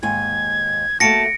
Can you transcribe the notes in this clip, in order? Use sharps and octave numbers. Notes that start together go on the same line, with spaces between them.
D#2 G#2 G#5 G#6
A3 A#3 F#4 A5 A#6 C#7 D7